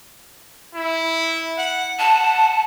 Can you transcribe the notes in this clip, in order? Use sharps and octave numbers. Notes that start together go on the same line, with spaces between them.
E4
F#5
F#5 A5